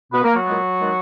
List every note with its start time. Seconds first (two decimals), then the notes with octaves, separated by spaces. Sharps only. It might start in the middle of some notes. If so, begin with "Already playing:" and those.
0.13 B2 A#3 B3 B4
0.23 A#3 A#4
0.35 F#3 F#4
0.46 A#2 G#3 B3
0.79 D#3 G#3 B3